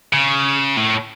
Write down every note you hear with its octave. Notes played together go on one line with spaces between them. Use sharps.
C#3
A2